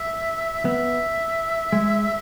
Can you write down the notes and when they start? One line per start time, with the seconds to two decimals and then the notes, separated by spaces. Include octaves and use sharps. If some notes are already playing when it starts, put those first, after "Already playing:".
Already playing: E5
0.65 B3 E5
1.73 G#3